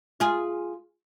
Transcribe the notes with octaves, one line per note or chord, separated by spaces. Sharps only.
F4 G#4